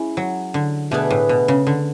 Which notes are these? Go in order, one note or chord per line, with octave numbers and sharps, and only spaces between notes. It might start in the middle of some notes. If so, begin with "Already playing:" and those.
Already playing: G#3 C#4 E4
F#3
D3
B2 A3 D4 G#4 B4
A2
B2
C#3
D3